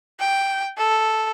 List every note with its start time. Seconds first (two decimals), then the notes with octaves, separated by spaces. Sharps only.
0.20 G5
0.77 A4